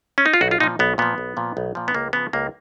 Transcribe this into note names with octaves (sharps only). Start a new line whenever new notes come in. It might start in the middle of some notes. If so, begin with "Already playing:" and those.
C#4
D#4
F4
B1 F#4
F4
A#2 F3 D#4
B1 B3
A#2 F3 B3
B1
A#2 F3
B1
A#2 F3
B3
C#2 A#3
C#3 F3 B3
C#2 A#3